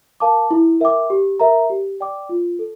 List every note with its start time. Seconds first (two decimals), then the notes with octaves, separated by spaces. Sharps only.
0.20 A#4 F5 A5 D6
0.51 E4
0.81 A#4 E5 G5 D6
1.10 G4
1.40 A#4 E5 A#5
1.70 G4
2.00 D5 G5 D6
2.29 F4
2.59 A4